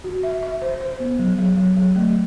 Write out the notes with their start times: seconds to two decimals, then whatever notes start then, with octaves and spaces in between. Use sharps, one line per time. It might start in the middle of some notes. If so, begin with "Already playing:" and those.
0.04 F#4
0.23 E5
0.43 E5
0.62 C5
0.81 C5
1.00 B3
1.19 F#3
1.39 F#3
1.57 F#3
1.77 F#3
1.96 A3